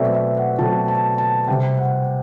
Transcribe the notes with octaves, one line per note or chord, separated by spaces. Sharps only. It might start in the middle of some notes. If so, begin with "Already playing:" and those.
Already playing: B2 F#3 A3 C4 D5 E5
E5
F#5
B2 F#3 A3 C4 A5
A5
A5
C3 G3 C4 G5
F#5